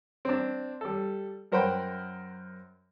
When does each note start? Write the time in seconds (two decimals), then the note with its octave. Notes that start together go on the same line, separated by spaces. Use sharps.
0.25 C4 D4
0.81 G3 A4
1.52 F#2 A#4 C5 F#5 G5 B5